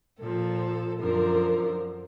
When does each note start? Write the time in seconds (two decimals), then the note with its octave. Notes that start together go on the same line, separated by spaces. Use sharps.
0.20 A#2 F3 A4
1.00 F#2 D3 F3 A#4